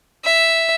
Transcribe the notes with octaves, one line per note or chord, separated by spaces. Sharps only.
E5